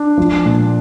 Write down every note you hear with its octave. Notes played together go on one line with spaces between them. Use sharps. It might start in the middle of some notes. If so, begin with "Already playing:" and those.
Already playing: D4
F3
A#2